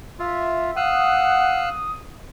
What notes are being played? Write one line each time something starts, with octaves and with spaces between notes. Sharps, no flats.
F4 E5
F5 F#5 D#6 E6 F#6